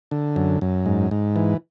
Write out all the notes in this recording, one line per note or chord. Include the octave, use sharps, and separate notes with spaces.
D3
F#2
F#2
G#2
G#2
E3